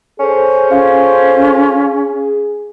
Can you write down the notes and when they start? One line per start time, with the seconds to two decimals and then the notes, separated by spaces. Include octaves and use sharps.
0.20 C#4 G#4 A4 C5
0.71 C#4 F4